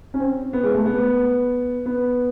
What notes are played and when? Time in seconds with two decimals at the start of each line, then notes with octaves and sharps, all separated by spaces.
0.14 C#4
0.20 C4
0.53 B3
0.63 G#3
0.74 A3
0.85 B3
1.86 B3